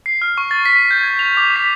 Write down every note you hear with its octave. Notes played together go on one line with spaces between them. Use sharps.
C7
F6
C#6
A6
B6
G6
G#6
F7
D6
B6